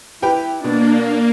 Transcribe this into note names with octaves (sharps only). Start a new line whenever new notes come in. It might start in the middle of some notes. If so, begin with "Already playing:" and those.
E4 G4 B4 G5
B2 A#3 D4